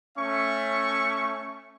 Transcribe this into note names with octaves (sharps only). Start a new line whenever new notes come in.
A3 C#4 E5 C#6